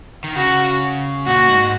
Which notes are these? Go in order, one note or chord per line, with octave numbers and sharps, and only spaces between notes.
D#3
C#3 F#4
A#2 F#4
G#2